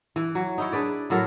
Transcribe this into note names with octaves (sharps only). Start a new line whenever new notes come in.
E3
F#3
D#4 E4 C#5
D4 G#4 B4 D5
A2 F#3 A4 A#4